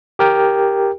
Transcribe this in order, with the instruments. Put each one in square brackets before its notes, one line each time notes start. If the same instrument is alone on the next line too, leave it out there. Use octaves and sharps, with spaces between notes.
[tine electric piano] G4 A#4 G5